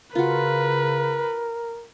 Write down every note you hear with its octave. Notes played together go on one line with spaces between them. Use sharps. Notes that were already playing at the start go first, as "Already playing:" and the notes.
C#3 F4 F#4 A#4 B4